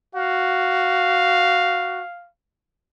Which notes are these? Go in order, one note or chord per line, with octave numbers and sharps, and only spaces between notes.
F#4 F5